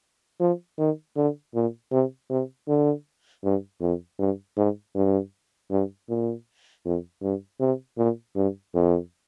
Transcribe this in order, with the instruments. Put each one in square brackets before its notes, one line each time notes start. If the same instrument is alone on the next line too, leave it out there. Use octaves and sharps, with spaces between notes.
[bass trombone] F3
D#3
D3
A#2
C3
C3
D3
G2
F2
G2
G#2
G2
G2
A#2
F2
G2
C3
A#2
G2
F2